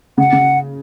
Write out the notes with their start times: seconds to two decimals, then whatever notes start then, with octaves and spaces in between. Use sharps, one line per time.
0.18 C#3 F#5
0.32 C#3